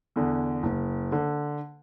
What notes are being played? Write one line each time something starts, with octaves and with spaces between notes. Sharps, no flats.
E2 D3
F#1
D3